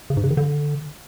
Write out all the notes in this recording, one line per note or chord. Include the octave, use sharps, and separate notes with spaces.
C#3
G#2
C#3
D#3
D3